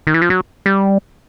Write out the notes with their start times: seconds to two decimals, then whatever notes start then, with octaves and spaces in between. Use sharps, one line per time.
0.07 D#3
0.14 E3
0.22 F3
0.30 F#3
0.66 G3